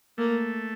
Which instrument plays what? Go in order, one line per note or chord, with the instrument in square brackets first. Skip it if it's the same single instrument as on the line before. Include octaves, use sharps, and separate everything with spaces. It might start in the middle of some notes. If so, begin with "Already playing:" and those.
[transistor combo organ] A3 [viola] A#3